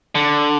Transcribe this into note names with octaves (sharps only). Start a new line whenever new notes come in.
D3